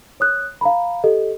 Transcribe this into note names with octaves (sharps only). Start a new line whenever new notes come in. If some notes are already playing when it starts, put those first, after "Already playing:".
C#5 D#6 F#6
F5 A#5 B5
G4 A4 D#5